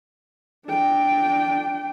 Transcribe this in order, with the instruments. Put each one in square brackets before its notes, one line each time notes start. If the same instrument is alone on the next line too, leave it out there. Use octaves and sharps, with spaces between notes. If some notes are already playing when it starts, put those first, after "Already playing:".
[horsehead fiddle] D4 G5